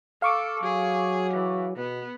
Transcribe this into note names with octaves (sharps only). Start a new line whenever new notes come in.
A4 F5 C#6 D6
F#3 G#4
E3
B2 B3